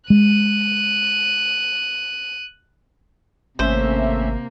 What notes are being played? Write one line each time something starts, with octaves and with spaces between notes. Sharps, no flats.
G#3 F#6 D#7
G#1 C3 A3 A#3 C#4 C5 E5